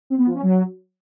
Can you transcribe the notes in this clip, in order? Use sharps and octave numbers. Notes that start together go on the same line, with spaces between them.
C4
B3
F3
C#4
F#3